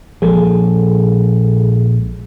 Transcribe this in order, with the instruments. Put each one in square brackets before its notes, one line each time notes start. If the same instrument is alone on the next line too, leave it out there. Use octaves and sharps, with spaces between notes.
[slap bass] A#1 F3 G#3 [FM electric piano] G#4 A4